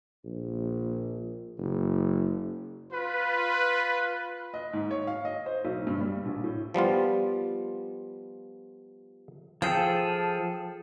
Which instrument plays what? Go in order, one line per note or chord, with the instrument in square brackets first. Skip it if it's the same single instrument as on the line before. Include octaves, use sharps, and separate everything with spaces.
[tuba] A#1
F#1
[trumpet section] F4 B4
[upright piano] D#5
G#2
C#5
F5
D#5
C5
B1
G2
G3
A#1
A2
[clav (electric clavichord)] F3 G3 B3 F4
[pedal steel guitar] F3 G#4 A4 [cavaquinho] G5